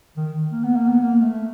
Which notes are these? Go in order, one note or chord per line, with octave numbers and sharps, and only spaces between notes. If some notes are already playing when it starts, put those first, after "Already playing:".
D#3
A#3
B3
A#3
B3
A#3
A3